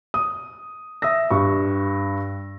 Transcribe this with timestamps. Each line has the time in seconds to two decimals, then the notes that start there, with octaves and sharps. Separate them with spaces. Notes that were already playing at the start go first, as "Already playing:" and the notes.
0.14 D#6
1.02 E5 D#6 E6 A#6
1.31 G2 C#6